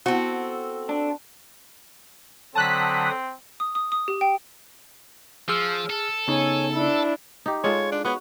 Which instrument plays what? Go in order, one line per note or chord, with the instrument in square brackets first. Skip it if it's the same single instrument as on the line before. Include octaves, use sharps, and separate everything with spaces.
[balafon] B3 E4 [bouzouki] C4 A4 [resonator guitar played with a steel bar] F#4
[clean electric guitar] D4
[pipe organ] D3 F#3 D#6 [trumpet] C4 [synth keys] A5 F#6 B6
[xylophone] D#6
D#6
D#6
G4
G5
[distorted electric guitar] F3 [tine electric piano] G#4 E6 F6
[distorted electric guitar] A4
[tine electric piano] C#3 B3 D#4 [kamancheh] C#5 G#5
[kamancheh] D4 E4
[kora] D#4 G4
[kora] G#3 F4 A4 [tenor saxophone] C#5
[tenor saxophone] D4
[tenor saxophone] B3 [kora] F#4 C#5